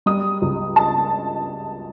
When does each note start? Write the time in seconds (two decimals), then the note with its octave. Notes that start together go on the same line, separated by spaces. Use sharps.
0.06 G3 D#6
0.42 C#2
0.76 A5